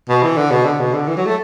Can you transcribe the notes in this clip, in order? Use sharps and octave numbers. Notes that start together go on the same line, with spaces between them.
B2
E3
D3
B2
D3
B2
D3
E3
F#3
A3